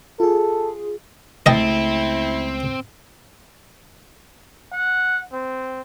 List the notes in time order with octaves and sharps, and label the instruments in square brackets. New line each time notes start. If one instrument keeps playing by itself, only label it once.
[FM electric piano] F4 G#4 [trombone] A4
[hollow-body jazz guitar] C#2 A3 A5 [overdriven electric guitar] C4 [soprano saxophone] E4 [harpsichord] D#5 G5
[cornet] F#5
C4